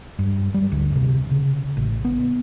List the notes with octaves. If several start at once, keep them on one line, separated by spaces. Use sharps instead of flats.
G2
G3
D2
C3
C#3
A1
B3